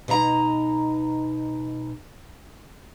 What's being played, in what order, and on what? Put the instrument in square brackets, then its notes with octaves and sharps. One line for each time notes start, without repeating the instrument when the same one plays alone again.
[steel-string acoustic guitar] B2 D#4 E5 A#5